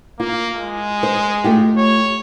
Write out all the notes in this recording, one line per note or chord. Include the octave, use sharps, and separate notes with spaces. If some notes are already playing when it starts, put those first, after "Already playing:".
A#3 F4
G#3
C5
A3 F4 G4
C#5